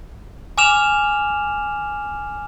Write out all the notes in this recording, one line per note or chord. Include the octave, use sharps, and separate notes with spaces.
G#5 D6 F6 E7 F7